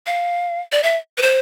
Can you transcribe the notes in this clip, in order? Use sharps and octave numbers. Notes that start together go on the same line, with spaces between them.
F5
D5
E5
B4
C5